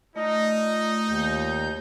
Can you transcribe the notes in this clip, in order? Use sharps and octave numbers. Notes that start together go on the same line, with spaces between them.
A3 D#4 F4 D5 D#5
D#2 G6